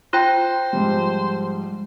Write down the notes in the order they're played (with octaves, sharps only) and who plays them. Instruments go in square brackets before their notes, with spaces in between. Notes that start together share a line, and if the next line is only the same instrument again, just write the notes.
[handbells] F4 G5 [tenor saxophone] C5
[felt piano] G#2 F3 G3